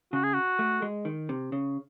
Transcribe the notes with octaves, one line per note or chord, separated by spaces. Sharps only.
C#3 F#4
G#4
F#4
A3
G#3
D#3
C3
C#3